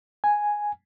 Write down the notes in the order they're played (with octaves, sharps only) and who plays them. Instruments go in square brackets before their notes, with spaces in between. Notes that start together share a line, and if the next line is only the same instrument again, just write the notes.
[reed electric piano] G#5